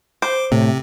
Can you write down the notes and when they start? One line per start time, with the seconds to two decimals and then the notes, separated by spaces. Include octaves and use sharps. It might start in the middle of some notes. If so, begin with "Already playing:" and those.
0.22 C5 D6
0.52 A2 C3